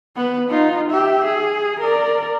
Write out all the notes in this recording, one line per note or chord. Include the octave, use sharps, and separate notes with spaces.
B3 B4
D#4 F4
G4 E5
G#4
A#4 D5